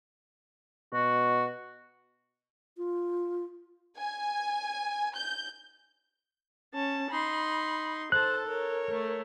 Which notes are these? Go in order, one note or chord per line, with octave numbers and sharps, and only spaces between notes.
B2 F#4
F4
G#5
G6
C#4 A5
D#4 B5 C6
A4 C5 A5 F#6
A#4 C#5
A3